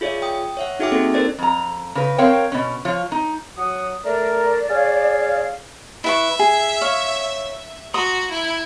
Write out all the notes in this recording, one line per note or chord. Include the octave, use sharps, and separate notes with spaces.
F4 G#4 C#5 D5 E5
G5 D#6
C#5 E5 F#5
D#4 F#4 G#4 E5 G5 D6
A#3 C4 C#4 D#4 A4
A4 A#4 C5 D5 A6
F2 A#5
C#3 B4
C4 A#4 C#5 F5 G5
B2 C#4
F3 F4 C#5
D#4
F#3 F#5 D#6
A3 A#4 D5
G#4 C#5 F5
E4 B4 E5 C#6
G#4
C#5 F5
F#4 A#5 C6 D#6
E4